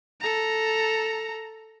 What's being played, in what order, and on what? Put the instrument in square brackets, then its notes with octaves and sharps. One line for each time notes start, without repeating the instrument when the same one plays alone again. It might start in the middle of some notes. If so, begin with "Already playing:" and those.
[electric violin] A4 A#5